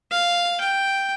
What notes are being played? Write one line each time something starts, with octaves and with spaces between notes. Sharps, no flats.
F5
G5